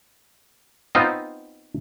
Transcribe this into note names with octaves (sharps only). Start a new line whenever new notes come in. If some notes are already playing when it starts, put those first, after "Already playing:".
B3 C4 D#4 F4